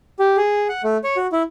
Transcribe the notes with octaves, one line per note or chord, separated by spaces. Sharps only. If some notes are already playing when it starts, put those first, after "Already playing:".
G4
G#4
F#5
A3
C#5
F#4
E4